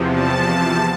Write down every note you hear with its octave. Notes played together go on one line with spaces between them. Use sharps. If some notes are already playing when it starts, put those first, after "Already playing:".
Already playing: E2 C3 F3
A5